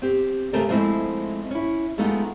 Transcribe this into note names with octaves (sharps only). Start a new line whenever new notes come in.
C4 G4
C#3 A3 A#3 C4 G4 A4
F3 G#3 A3 C4 E4
C#4 E4
F3 G#3 A3 B3 D#4 F4